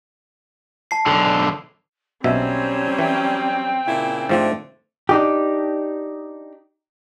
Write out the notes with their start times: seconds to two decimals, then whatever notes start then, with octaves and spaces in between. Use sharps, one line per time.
0.91 A5 C7
1.07 B1 D3
2.24 B1 B2 F#3 G3 C4 C#4 C5 E5
2.99 E3 G5
3.86 A#2 C#3 E4
4.29 G#2 D3 F3 A3 C4
5.09 D4 D#4 G4